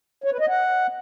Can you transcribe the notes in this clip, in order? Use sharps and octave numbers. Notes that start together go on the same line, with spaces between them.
C#5
B4
D#5
F#5